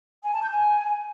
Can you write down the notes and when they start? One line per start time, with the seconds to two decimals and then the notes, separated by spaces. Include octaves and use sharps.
0.23 G#5
0.33 A5
0.42 G6
0.51 G#5